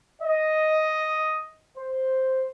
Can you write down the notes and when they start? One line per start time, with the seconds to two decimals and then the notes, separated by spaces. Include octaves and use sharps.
0.22 D#5
1.76 C5